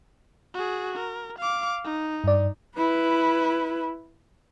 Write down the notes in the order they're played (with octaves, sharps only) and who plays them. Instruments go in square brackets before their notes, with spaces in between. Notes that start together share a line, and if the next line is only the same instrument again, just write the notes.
[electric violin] F#4 G#4
A#4
F5 D6
D#4
[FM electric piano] G2 D5
[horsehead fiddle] E4 B4